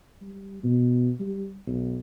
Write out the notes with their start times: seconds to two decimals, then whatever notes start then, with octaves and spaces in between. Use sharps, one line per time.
0.21 G3
0.63 B2
1.20 G3
1.67 B1